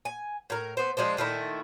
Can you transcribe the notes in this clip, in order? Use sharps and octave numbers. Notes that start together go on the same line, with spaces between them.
G#5
A2 A#4
B3 C5
F3 G#3 D4 C5
A#2 D#3 A3 E4